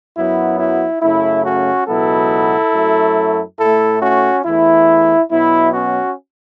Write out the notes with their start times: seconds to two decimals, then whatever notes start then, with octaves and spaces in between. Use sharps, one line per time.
0.16 F#2 F#3 B3 E4
0.59 E4
1.02 F#2 C#3 A3 E4
1.45 C#4 F#4
1.88 C#2 B2 F#3 B3 E4 A4
2.74 F#2 F#3 A3
3.59 A2 A3 E4 A4
4.02 C#4 F#4
4.45 E2 E3 A3 E4
5.31 B2 F#3 B3 E4
5.73 C#4 F#4